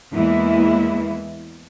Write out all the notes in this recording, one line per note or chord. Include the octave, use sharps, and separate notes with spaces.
E2 E3 G#3 A#3 E4